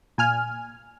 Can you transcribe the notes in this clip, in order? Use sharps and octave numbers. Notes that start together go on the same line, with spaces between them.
A#2 G#5 F6